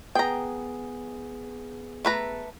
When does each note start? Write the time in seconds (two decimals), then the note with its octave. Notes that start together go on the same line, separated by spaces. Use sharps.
0.15 B3 G#4 G5 A#5
2.05 A3 B4 A#5